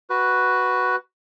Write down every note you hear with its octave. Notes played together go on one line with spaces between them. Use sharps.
F#4 B4